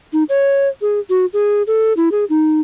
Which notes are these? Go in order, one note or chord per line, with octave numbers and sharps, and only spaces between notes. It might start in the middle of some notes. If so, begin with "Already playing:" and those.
D#4
C#5
G#4
F#4
G#4
A4
E4
G#4
D#4